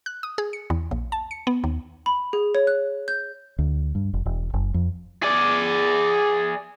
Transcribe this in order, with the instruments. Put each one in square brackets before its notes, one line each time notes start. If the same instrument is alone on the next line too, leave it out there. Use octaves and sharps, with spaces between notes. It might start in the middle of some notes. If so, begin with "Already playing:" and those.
[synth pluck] F#6
D#6
G#4
C#7
E2
A#1
A5
C#7
B3
D#2
[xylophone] B5
G#4
C#5
F#6
G6
[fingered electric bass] D2
G2
F1
E1
F#1
F2
[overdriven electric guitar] G#4 D5